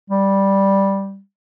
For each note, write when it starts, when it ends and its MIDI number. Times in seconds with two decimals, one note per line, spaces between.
0.10 1.20 55